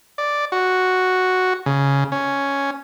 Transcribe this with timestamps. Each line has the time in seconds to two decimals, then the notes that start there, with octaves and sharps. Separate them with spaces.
0.18 D5
0.52 F#4
1.66 C#3
2.12 C#4